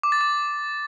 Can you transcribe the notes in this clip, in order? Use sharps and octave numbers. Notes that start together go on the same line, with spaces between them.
D6
A6
D6